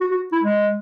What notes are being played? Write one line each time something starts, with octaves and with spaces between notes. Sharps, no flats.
F#4
F#4
E4
G#3